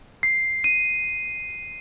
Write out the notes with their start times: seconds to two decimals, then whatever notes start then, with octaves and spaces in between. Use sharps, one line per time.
0.23 C7
0.64 D#7